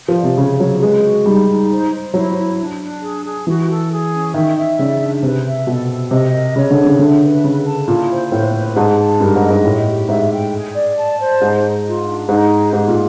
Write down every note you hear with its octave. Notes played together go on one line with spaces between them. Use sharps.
F3
D5
C3
C#3 C#5
F#3 C#5
G#3 B4
F#4
G3 D#4
D#4
C5
C5
F#3 E4
E4
D4
D4
G#4
G#4
E3 F#4
A4
G#4
C#4
D#3 E5
E5
C#3 D5
D4
C3 B4
E5
B2 A4
A4
C3 D#5
A#4
C#3 C#5
D3
G#4
C#3
D3 E5
B4
C#3 A4
A5
A#2 E4
C5
A2 B4
B4
G#2 A5
A5
G2 A#4
G#2
D#5
G#2
A2 G4
G4
G#2 E5
G5
G#4
D5
A5
C5
G#2 D#4
D#4
F4
D4
G#2 D#4
G#4
G#2 G4
A#2